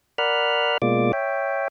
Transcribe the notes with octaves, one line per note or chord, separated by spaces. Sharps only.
A#4 D5 F#5 B5 F6
B2 G#3 A#3 F4 D5 D6
C#5 E5 G5